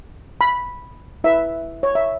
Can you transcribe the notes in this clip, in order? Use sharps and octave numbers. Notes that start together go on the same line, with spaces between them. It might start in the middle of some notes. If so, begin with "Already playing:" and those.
B5
E4 B4 E5
C#5
E5